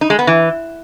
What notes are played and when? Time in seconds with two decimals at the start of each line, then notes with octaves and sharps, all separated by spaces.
0.01 D#4
0.10 G#3
0.19 B3
0.27 E3